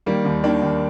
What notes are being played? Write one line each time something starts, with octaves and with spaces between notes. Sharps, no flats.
D#3 G3 A#3
D#2
D#3 A#3 D4
D#2